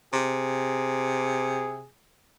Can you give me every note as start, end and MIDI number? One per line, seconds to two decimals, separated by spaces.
0.13 1.87 48
0.13 1.89 68